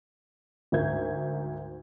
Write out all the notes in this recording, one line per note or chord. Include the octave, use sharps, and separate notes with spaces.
D2 G#2 A#4 E5 G6 G#6